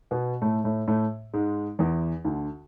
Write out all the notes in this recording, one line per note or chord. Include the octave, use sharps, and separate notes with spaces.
B2 B3
A2 A3
A2 A3
A2 A3
G#2 G#3
E2 E3
D2 D3